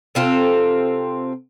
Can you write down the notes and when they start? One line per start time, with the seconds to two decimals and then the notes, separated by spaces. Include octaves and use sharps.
0.15 C3 C4 F4 A4